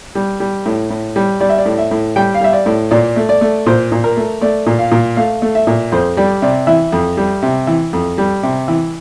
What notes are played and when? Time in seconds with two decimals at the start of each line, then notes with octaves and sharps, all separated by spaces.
0.15 G3
0.40 G3
0.66 A2
0.90 A2
1.16 G3
1.40 G3 D5
1.49 E5
1.58 D5
1.65 A2
1.78 E5
1.91 A2
2.16 G3 G5
2.34 F5
2.41 G3 E5
2.53 D5
2.66 A2
2.91 A#2 D5
3.16 A3
3.29 D5
3.41 A3
3.66 A#2 C5
3.92 A#2
4.04 A#4
4.17 A3
4.41 A3 D5
4.66 A#2
4.79 F5
4.91 A#2
5.17 A3 F5
5.42 A3
5.55 E5
5.67 A#2
5.92 F2 C5
6.17 G3 D5
6.42 C3 D5
6.67 E3 E5
6.92 F2
7.17 G3
7.42 C3
7.67 E3
7.93 F2
8.18 G3
8.43 C3
8.68 E3